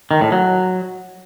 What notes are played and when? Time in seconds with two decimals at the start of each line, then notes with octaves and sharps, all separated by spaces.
0.11 D#3
0.21 A2
0.32 F#3